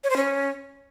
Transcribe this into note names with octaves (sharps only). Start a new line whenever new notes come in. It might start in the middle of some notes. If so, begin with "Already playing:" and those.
C#5
C5
C#4